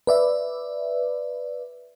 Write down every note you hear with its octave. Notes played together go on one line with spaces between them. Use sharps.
B4 D5 E5